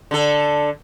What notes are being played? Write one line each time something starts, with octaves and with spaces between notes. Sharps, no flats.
D3 A4